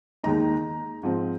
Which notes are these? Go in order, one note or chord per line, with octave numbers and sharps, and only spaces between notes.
D#2 D#3 G#3 D#4 A#5
G#2 F3 C4